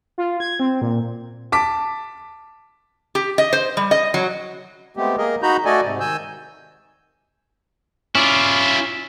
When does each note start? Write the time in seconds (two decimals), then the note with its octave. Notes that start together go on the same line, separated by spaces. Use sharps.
0.18 F4
0.40 G#6
0.60 C4
0.81 A#2
1.52 A5 D6 B6
3.15 G4
3.38 D#5
3.53 C5
3.77 G3
3.91 D#5
4.14 F#3
4.97 G#3 A3 B3 C4 G4
5.18 A#3 G#4 A#4 D#5
5.42 D#4 F#4 A#5 B5 G6
5.65 A3 F#4 A4 D5 D#5 G#5
5.84 G#2 C3
6.00 D#3 G#5 E6 G6
8.15 C#4 E4 F4 D5